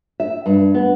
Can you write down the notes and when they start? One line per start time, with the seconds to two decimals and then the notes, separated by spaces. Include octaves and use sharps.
0.20 E5
0.46 G2
0.74 B3